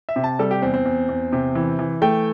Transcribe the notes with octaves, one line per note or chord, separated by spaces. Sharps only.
E5
C3
A5
G3 A4
G4
E2 C4
C4
E2
E2
C3
E3
E3
A3 G5